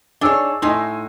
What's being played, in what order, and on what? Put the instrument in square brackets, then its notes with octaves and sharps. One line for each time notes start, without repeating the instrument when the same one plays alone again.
[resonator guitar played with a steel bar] D4 C#5 [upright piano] D#4 G#4 E6
[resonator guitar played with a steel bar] A2 D#4 [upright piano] D#5 G#5 C6